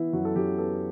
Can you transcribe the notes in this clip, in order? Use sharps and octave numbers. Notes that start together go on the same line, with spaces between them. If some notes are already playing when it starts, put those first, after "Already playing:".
Already playing: E3 B3 E4
F#2 F#4
A4
F#2 G4
B3 A4